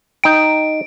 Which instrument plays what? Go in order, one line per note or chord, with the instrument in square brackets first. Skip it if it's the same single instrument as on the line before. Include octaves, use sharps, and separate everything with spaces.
[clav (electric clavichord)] D#4 G5 [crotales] D7